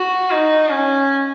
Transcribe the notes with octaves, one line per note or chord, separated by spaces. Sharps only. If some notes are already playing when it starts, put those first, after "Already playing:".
Already playing: F#4
D#4
C#4